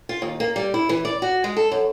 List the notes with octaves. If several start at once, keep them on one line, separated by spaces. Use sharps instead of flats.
F4
D#2
A#3
G3
E4
E3
D5
F#4
G#3
A4
F#2